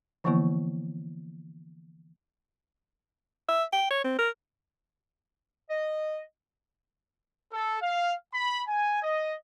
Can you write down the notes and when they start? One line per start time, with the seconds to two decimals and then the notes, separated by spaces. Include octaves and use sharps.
0.24 D3 E3 F3 A#3 B3 E4
3.48 E5
3.73 G5
3.90 C#5
4.04 C4
4.18 A#4
5.69 D#5
7.52 A4
7.81 F5
8.34 B5
8.67 G#5
9.02 D#5